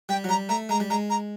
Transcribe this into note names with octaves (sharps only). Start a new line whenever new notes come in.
G3 G5
F#3
G3 A#5
A3 A#5
G#3 A#5
G3
G#3 A#5
A#5